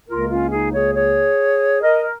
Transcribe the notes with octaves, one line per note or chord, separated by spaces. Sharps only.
C#2 C#3 A#3 F4 A#4
C#4 F4
D#4 G#4
G#4 C#5
G#4 C#5
A#4 D#5